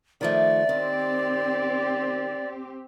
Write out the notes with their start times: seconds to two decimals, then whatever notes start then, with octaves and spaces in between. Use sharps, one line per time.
0.21 D#3 F3 A3 D5
0.69 D#3 C4 G4